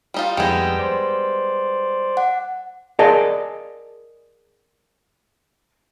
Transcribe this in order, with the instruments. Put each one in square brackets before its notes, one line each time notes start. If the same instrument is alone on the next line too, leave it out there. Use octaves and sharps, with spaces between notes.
[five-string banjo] G3 D#4 F4
[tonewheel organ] F2 G5 E6 [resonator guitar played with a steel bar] G3 G#3 [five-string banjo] B3 D#4
[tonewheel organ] C5 D5
[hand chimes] F#5
[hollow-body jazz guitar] G#4 A#4 D5 D#5 F5 A5